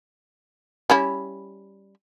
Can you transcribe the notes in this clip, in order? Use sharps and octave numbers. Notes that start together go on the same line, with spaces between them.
G3 C#4 E4